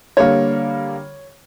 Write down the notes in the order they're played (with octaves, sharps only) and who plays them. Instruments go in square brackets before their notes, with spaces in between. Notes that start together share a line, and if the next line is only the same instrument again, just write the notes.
[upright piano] D3 G3 A#3 [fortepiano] C#5